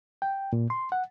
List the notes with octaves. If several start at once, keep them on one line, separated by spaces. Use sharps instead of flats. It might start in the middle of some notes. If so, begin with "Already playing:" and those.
G5
A#2
C6
F#5